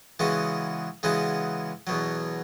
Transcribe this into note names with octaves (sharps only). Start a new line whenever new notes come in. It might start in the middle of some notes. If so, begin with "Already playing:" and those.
C#3 E3 G#3 B3 F#4
C#3 E3 G#3 B3 F#4
E2 B2 F#3